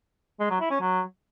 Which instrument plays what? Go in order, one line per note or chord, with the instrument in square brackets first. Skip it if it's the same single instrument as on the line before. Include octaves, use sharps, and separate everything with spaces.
[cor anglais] G#3
F#3
E4
C#4
F#3